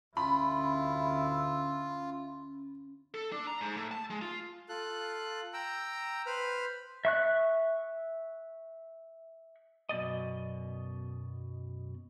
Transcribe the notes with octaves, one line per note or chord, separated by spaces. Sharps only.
D2 C#4 E4 F4 B5
A4
D4
A#5
G#2
A2
A5
G#3
F4
F4 A4 F#6
G5 A#5 E6
B4 C5 B5 F6
E5 C#6 F#6
F#2 B2 D5 D#5